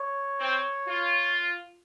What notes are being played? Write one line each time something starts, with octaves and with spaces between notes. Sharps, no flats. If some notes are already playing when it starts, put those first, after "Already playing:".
Already playing: C#5
C4
F4